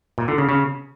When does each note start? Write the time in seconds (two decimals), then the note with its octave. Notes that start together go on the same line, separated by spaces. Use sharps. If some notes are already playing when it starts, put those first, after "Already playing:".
0.18 A#2
0.28 D3
0.38 C#3
0.49 C#3